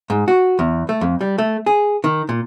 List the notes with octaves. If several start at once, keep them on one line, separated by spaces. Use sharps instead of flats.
G#2
F#4
E2
A3
F2
G3
A3
G#4
D#3
A#2